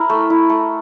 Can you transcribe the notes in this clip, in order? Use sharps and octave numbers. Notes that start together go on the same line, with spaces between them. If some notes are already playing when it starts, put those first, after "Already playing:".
Already playing: E4 A#4
A3
E4
A3